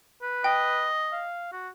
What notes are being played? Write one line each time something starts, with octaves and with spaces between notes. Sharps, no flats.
B4
D#5 G5
F5
F#4